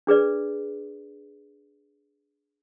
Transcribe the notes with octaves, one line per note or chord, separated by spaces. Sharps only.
D4 G#4 B4 D5